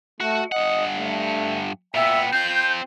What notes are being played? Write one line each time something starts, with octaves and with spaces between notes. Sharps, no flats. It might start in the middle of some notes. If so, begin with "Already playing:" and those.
A3 F#4
G2 D#5 F#5
A3
A#2 B3 E5 G5
C4 F4 G6